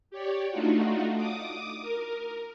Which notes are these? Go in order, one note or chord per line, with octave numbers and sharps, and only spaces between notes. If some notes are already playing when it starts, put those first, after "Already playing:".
G4 C#5 D5
A3 D4 D#4 F4 F#4
D6 D#6
A#4